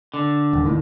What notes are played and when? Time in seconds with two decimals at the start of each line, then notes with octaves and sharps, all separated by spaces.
0.14 D3
0.53 D#1
0.65 D#2 A2 D#3